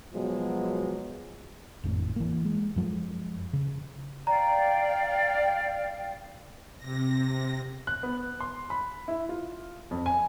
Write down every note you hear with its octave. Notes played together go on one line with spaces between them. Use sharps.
B2 F3 F#3 G#3
G#1 F2 A2 D4
E3 A#3
G#3
F#2 F3 G#3
C#3
D5 F5 G5 A#5
C3 A#6
F#6
B3
C6
B5
E4
F4
F2
G#5